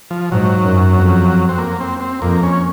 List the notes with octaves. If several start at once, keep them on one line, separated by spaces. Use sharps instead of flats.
F3
G#2 F#3
F#2
F2
C4
A#3
C4
C4
F2 A#3
C#4